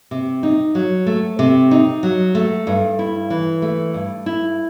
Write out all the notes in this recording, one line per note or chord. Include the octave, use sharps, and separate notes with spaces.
C3
D#4
F#3
A3
C3
D#4
F#3
A3
G2
E4
E3
A3
G2
E4